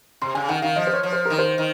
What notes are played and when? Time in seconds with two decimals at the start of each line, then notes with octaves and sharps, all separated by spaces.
0.21 C3 C6
0.35 C#3 G#5
0.49 D#3 F#5
0.62 D#3 F5
0.76 F3 D#5
0.87 C5
0.93 C#5
1.03 F3
1.13 C5
1.25 D#3 A#4
1.39 C5
1.58 D#3